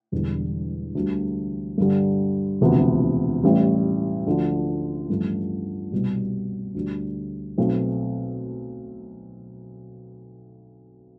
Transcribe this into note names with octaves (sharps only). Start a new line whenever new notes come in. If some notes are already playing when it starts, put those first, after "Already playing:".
E1 E2 D3 G3
D2 D3 G3
G2 D3 G3
E1 D2 C3 F3 B3
A1 A2 G3
D2 D3 F3
A1 G2 F3 A3
C2 B2 G3
D2 D3 G3
B1 B2 A3 C4